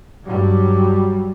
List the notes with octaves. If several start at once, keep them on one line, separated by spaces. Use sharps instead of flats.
G2 F#3 G3